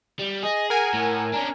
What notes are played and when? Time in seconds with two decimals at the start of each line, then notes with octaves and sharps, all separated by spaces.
0.19 G3
0.43 G#4 D#5
0.70 A#4 F#5 G#5
0.94 A2
1.33 C#4 D4 A#5